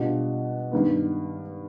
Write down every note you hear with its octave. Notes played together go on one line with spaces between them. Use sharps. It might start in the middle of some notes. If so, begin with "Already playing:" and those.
Already playing: B2 G3 D4 F4
G2 D#3 B3